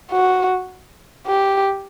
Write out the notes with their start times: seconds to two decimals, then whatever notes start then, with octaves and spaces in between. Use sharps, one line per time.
0.11 F#4
1.27 G4